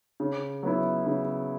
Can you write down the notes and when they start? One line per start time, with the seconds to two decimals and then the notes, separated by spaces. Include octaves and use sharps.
0.20 C#3
0.63 F#3 B3 E4
1.06 C#3